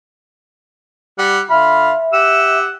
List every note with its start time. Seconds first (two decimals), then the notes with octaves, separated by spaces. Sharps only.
1.19 G3 F#5
1.50 D3 F4 E5 B5 F6
2.13 G4 F#5 E6